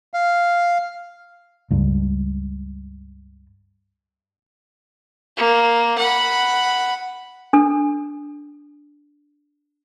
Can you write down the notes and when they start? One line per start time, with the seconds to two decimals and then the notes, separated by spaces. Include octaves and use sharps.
0.14 F5
1.71 C#2 G2
5.37 A#3
5.98 F#5 B5
7.53 D4 A4